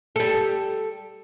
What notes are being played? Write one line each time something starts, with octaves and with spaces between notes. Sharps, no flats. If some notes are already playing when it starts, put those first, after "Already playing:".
G3 A4